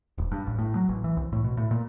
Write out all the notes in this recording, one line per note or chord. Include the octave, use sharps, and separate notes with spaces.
D#1
G2
A1
A2
F#3
A1
E3
C2
A2
B2
A2
A#2